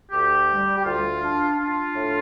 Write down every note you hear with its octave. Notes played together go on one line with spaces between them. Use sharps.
D2 G4
G3
G4
D2 F4
D4
D4 F4
A2